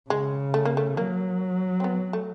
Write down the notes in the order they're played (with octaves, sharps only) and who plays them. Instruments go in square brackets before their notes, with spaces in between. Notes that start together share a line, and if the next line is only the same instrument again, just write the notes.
[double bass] C#3 [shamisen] G#3
[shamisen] A3
A#3
A3
[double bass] F#3 [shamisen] A#3
[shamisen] C4
B3
A3